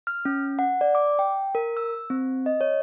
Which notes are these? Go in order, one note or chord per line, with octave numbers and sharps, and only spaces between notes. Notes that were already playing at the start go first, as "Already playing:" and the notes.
F6
C#4
F#5
D5
D6
G5
A#4
E6
C4
D#5
C#5